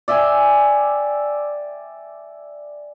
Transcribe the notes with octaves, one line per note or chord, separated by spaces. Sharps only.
D5 E5 G5 G#5